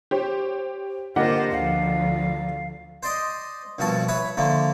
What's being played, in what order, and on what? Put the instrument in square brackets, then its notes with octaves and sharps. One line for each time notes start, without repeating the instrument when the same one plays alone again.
[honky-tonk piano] G4 C5 C#5
[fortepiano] D3 A#3 G4 [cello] F4 C5 [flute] D#5 [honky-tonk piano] F#5
[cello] D2 F3 [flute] F5
[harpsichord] C5 D5 D#5
A#1 G2 B2 F#4 A5
B4 C#5 E5
D3 F3 A3 A#3